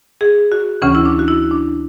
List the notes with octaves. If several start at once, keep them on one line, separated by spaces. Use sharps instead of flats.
G#4
F#4
D2 C#3 E3 C#4
E4
D4
F#4
E4
D4